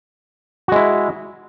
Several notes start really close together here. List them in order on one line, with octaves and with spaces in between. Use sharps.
F#4 G#3 E4